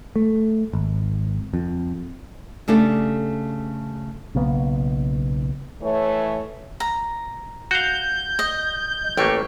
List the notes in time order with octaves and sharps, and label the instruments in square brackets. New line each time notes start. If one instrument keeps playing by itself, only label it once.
[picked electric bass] A3
G#1
F2
[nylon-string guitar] C#3 A3 D4 G4 A4
[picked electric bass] B1 C#3 A#3 B3
[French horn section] E3 A3 C#5
[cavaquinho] A#5
[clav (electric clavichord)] F#4 F5 [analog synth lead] G6
[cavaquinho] D#5
[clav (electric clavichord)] A1 A3 A#3 [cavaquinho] G4 C#6